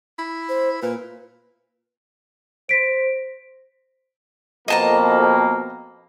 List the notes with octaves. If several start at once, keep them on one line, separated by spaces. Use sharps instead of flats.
E4
C5
A#2 B4
C5 A#6 B6 D7
F2 B2 A#3 D#5 A5 A#5